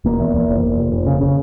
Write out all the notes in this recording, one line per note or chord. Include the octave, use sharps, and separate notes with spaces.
E1 A#3
E2
E2
F1
F1
F1
F1
C#3
C#3